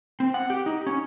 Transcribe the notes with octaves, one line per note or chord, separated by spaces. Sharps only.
C4
F#5
G4
D#4
C#4